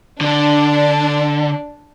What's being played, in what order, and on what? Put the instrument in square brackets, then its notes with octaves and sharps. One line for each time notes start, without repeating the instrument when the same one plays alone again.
[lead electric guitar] D3 [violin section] D4